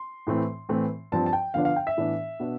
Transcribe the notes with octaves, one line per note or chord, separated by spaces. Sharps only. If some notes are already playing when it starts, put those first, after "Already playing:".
Already playing: C6
A2 E3 A3 C4
A2 E3 A3 C4
G2 F3 C4 A5
A5
G5
D3 F3 B3 D4 F5
F5
G5
E5
A2 E3 B3 D4
B2 B3 D4